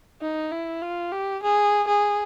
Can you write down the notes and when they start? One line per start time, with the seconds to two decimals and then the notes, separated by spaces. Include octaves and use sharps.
0.22 D#4
0.52 E4
0.82 F4
1.12 G4
1.43 G#4
1.88 G#4